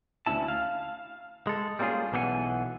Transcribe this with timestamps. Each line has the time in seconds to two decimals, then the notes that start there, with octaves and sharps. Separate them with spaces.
0.27 D2 G#2 C#4 E4 A5
0.48 F5
1.47 G#3 A4
1.79 G3 G#3 A#3 C#4 F4 G#4
2.12 B1 B2 E3 G4 F#5 G#5